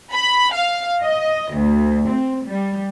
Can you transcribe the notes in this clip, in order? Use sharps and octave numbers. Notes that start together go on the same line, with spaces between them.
B5
F5
D#5
D2
C4
G3